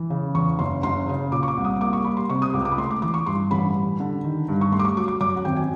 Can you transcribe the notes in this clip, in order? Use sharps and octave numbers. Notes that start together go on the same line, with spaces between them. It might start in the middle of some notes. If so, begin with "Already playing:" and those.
Already playing: E3
C#3
E2 C#6
F#1 C6
F#1 C6
C#3
A#2 D6
C#6
D6
C2
D#6
A#3 D6
C#6
G3 B5
C6
C3 C#6
D#6
C#2 D6
D6
B5
A3 C6
D6
E3 D6
C#6
G2 C6
A1 B5
G3
D3
D#3
G2
C#6
A3 C6
D6
C#6
F#3 D6
D6
F#2 D6
F#5
G#1 G5
G#5